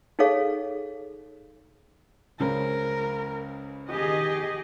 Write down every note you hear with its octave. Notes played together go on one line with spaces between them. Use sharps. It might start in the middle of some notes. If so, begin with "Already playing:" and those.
D#4 G#4 A4 C#5 F5
C#2 C#3 A#4 C5
D#3 G4 G#4 D#5